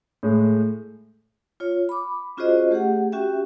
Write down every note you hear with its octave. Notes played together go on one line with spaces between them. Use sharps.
A2 G#3
F4 C#5
B5 D6
C#4 F4 F#4 G#4 C5 D#5
A3 G4 G#4 F#5
C#4 F#4 G4 E5 G5